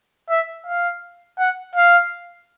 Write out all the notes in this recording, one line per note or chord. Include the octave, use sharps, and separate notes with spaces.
E5
F5
F#5
F5